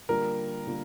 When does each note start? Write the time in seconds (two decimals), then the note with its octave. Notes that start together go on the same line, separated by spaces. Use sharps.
0.08 D3 G3 A#3 F4 A#4
0.67 D3 G3 A#3 F4